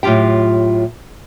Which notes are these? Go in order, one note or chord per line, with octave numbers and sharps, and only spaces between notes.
A2 F#3 F4 G4 G5